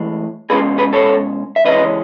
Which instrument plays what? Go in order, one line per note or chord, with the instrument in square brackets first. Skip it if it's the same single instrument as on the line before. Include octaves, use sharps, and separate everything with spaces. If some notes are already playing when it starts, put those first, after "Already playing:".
Already playing: [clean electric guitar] A2 E3 G#3
B2 G#3 C#4 G#4 B4
G#4 B4
A4 C#5
E5
C#3 E3 G#3 C#4 B4 D#5